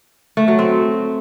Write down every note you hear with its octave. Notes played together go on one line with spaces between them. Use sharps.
A3
F#3
C4